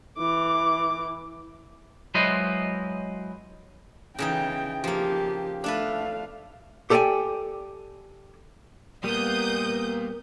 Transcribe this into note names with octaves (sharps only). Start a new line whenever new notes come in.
E3 D6
F#3 G#3 E4 B4 C5 D#5
C#3 E3 D#4 G5
F3 A#3 G4
A3 D4 A4 B4 F5
G4 A4 D5 D#5 G5 G#5
A#2 G3 B3 A#4 D#6 G6